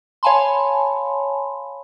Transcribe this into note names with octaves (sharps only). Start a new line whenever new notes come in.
C#5 F5 G#5 A5 B5 C6